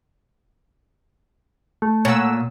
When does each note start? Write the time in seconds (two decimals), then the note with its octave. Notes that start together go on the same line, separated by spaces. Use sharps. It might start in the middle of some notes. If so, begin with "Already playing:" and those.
1.82 A3
2.05 A#2 C#5 F#5 E6